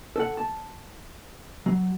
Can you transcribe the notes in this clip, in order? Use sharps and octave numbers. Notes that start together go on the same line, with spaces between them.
A4 F#5
A5
F#3